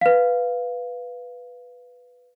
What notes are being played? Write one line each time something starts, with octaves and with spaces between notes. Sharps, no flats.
B4 F5